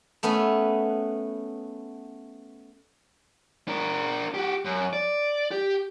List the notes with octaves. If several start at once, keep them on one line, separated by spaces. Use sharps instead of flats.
A3 B3 C#4 B4
D4 A#4
F#4 G4
F#2
D5
G4